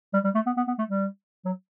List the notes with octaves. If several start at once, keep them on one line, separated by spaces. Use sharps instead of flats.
G3
G3
A3
B3
B3
B3
A3
G3
F#3